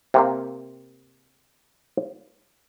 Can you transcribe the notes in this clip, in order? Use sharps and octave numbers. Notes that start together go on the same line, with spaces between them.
C3 A#3 C4